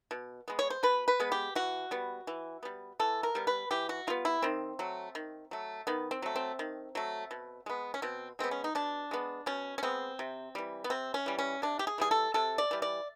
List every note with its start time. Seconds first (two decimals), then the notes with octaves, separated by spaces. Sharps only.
0.11 B2
0.48 G#3 B3
0.59 C#5
0.70 C5
0.83 B2 B4
1.08 B4
1.20 G#3 B3
1.32 G4
1.55 E3 F#4
1.91 G3 B3
2.27 E3
2.63 G3 B3
2.99 E3 A4
3.23 A#4
3.35 G3 B3
3.47 B4
3.71 E3 G4
3.89 F#4
4.07 G3 B3 F4
4.25 E4
4.42 D#3 C4
4.79 F#3 A3
5.15 D#3
5.51 F#3 A3
5.87 D#3 B3
6.11 C4
6.22 F#3 A3
6.36 C4
6.59 D#3
6.95 F#3 A3
7.31 B2
7.66 G#3 B3
7.94 C#4
8.02 B2 C4
8.39 G#3 B3 C4
8.51 C#4
8.64 D#4
8.75 B2 D4
9.11 G#3 B3
9.46 B2 C#4
9.78 C#4
9.83 G#3 B3 C4
10.19 C3
10.55 E3 G3
10.84 B3
10.90 C3 C4
11.14 C#4
11.26 E3 G3
11.39 C#4
11.62 C3 D4
11.79 G4
11.87 G#4
11.98 E3 G3 G#4
12.11 A4
12.34 C3 A4
12.58 D5
12.71 E3 G3
12.82 D5